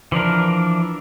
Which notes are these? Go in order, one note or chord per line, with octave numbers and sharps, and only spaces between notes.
E3 F3 D4 A#4